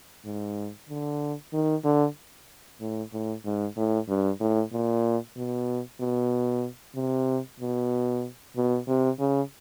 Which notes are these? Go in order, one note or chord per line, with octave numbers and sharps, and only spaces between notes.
G#2
D3
D#3
D3
A2
A2
G#2
A2
G2
A2
A#2
B2
B2
C3
B2
B2
C3
C#3